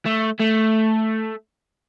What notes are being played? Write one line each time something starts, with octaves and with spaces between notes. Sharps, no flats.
A3
A3